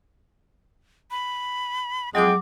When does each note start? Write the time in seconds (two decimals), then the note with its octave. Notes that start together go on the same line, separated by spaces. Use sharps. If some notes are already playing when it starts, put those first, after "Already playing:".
1.11 B5
2.15 F2 F#3 G#3 G#4 G5 D6